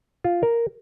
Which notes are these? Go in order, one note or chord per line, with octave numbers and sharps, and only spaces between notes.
F4
A#4